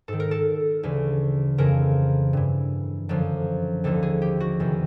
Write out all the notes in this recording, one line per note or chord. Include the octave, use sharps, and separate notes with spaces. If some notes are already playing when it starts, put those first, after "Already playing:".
G#2 D#3 A4
A#4
A4
D2 C#3 E3
F2 C#3 E3 A#4
G2 E3
F#2 D3 F3
D#2 D3 F3 A4
G#4
G4
F#4
E2 C3 D#3